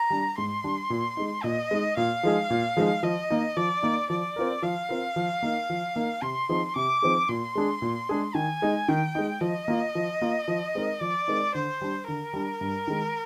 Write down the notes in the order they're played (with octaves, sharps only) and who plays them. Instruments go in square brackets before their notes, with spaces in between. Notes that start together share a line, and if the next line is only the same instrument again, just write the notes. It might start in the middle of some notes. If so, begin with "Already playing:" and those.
Already playing: [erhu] A#5
[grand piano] G3 D4
[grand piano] G#2 [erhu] C6
[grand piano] G3 D4
A#2
G#3 D#4
[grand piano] A#2 [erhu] D#5
[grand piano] G#3 D#4
[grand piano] A#2 [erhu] F5
[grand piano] F3 G#3 D#4 G#4
A#2
F3 G#3 D#4 G#4
[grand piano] F3 [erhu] D#5
[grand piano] A#3 D#4
[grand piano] F3 [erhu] D5
[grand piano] A#3 D#4
[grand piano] F3 [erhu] D5
[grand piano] C4 F4 A#4
[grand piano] F3 [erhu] F5
[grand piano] C4 F4 A#4
F3
A#3 D#4 A#4
F3
A#3 D#4 A#4
[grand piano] C3 [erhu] C6
[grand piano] F3 C4 D#4 G#4
[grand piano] C3 [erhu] D6
[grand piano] F3 C4 D#4 G#4
[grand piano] A#2 [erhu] C6
[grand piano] G#3 D4 G#4
A#2
G#3 D4 G#4
[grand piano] D#3 [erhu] G#5
[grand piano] G#3 D#4
[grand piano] D#3 [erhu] G5
[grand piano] G#3 D#4
[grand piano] F3 [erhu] D#5
[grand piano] A#3 F4
F3
A#3 F4
F3
G#3 C4 D#4 A#4
[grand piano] F3 [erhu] D5
[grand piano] G#3 C4 D#4 A#4
[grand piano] D3 [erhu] C5
[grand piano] G3 D4
[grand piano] D3 [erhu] A#4
[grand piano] G3 D4
G2
D#3 G#3